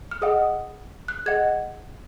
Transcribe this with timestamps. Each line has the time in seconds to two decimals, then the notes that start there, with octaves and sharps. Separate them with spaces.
0.11 F6
0.22 G#4 D#5 F#5 D#6
1.08 F#6
1.26 G#4 D#5 F#5 G#6